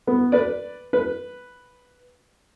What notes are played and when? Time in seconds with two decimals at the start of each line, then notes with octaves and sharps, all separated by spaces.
0.07 B3
0.32 B4 D5
0.93 B4